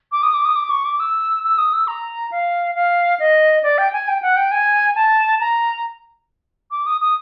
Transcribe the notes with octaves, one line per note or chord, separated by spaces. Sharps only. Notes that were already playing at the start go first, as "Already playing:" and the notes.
D6
D#6
D6
D#6
D6
C#6
D6
E6
E6
D#6
E6
A#5
F5
F5
D#5
D5
G5
G#5
G5
F#5
G5
G#5
A5
A#5
D6
D#6
D#6